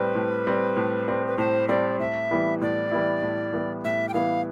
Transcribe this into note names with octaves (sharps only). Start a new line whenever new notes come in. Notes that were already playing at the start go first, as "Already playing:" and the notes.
Already playing: A2 G3 C4 B4
A2
G3 C4
A2
G3 C4
B4
A2 C5
G3 C4 D5
A2 E5
E3 G3 B3 E4
A2 D5
E3 G3 B3 E4
A2
E3 G3 B3 E4
A2 E5
G5
E3 G3 B3 E4 F5